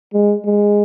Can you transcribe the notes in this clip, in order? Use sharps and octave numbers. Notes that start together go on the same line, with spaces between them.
G#3
G#3